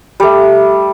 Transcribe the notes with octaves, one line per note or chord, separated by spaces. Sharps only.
G3 A3